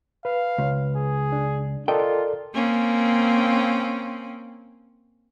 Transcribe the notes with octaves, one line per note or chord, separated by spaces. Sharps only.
B4 F5
C#2
G#4
D4
F4 A4 A#4 D5 D#5 G5
A#3 C4 C#4